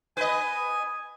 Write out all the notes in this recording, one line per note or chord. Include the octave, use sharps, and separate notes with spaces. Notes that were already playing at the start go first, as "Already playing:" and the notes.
B4 D#5 G#5